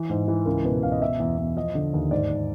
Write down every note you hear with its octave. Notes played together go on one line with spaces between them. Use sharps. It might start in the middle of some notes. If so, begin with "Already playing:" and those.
Already playing: E3
G#2
E3
C#2 A#4
B2 B4
C#2 F5
D#5
B2 E5
E2
E2
F3 D#5
D3
D#2
G#2 D5
G#2